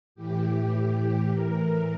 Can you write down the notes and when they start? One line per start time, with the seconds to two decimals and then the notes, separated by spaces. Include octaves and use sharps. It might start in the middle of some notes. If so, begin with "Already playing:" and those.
0.15 A2 E3 G4
0.44 G4
1.32 A2 E3 A#4